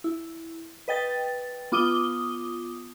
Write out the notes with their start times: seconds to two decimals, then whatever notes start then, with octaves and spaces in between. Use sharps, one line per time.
0.04 E4
0.88 B4 D#5 G5 A6
1.72 B3 F4 D6 D#6 D#7 G7